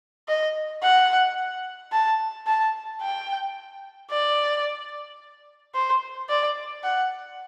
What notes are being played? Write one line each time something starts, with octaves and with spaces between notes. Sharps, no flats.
D#5
F#5
A5
A5
G5
D5
C5
D5
F#5